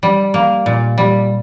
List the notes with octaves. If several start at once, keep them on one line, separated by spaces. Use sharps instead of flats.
G3
A#3
A#2
G3